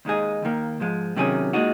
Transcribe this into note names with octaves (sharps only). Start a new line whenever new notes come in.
D#2 D#3 G#3 D#4 G#4
D#2 D#3 A#3
G#2 F3 G#3
C3 D#3 F#3 C#4 G#4
A#2 G#3 D#4 F#4